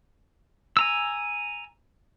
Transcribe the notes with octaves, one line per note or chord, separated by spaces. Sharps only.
G#5 A#5 E6